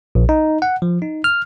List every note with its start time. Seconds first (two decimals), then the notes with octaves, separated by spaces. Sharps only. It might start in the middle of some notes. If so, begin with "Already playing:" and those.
0.15 A#1
0.29 D#4
0.62 F#5
0.82 F3
1.02 D#4
1.24 F6